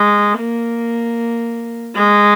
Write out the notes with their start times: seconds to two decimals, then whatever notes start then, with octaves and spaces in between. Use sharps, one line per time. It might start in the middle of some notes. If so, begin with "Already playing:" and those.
Already playing: G#3
0.40 A#3
1.96 G#3